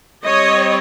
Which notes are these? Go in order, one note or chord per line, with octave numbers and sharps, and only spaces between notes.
G3 C4 C#5 D#5